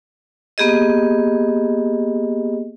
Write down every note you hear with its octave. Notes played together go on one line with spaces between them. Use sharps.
A#3 B3 G4 G#4 D#5